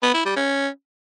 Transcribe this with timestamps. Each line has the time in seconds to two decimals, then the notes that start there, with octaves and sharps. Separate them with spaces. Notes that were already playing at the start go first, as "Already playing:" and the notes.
0.03 B3
0.14 E4
0.25 G3
0.36 C#4